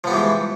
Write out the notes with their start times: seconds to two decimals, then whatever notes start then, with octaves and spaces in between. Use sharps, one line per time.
0.04 F3
0.07 B3
0.10 G3
0.13 E3
0.16 G#2